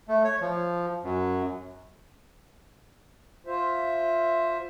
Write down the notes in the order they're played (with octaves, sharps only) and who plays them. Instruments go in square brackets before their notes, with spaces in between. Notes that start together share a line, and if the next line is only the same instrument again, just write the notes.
[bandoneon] A3
C#5
F3
F#2
[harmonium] F4 C5 E5